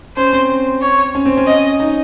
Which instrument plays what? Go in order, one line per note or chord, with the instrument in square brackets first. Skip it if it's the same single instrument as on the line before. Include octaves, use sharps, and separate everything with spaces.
[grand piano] C#4 [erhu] C5
[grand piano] C4
[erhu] C#5
[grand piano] C#4
C4
C#4
[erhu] D#5
[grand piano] D#4